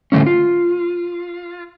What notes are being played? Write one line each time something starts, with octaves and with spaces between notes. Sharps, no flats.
A2 D3 G3 A3 C#4
F4